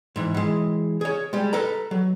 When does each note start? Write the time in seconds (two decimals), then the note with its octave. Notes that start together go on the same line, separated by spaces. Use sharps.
0.16 G#2 E3
0.34 E3 G#3
1.01 G#4 C#5
1.33 G3 G#3
1.53 A4 B4 A#5
1.91 F#3